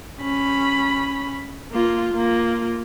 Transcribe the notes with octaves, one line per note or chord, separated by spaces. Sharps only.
C#4 B5
A#3 F4
A#3 F4